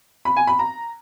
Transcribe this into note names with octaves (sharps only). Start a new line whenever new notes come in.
B5
G#5
B5
A#5